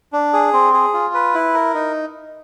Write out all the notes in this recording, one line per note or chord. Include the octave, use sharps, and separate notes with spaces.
D4
G#4
C4
G#4
F4
B4
E4
A#4
D#4